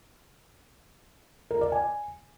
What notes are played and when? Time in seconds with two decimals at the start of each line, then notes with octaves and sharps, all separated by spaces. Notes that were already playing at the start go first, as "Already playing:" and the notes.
1.51 A#4
1.61 D5
1.72 G#5